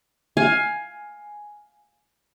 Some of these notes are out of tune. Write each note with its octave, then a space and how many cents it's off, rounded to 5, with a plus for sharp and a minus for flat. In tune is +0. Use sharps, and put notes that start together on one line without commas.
F5 +15 G#5 +5